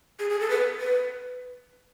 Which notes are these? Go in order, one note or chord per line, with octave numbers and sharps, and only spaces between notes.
G#4
G#4
A4
B4
B4